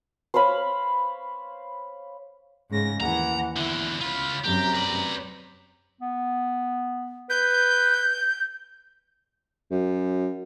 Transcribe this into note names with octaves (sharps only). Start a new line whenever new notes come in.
C5 C#5 F5 B5
G#2 C#3 A#6
D#2 E3 F#5 A#5
E2 D3 E4
C#2 F4 B5
F#2 C3 G4 A#5
B4 D5
B3
B4 G6
F#2